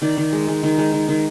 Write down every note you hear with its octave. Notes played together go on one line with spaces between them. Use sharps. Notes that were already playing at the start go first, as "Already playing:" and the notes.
D#3 D5
D#3
G#3
G#3
D#3
G#3
D#3
D#3